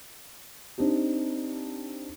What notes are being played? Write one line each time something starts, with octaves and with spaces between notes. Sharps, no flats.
C4 D4 D#4 G4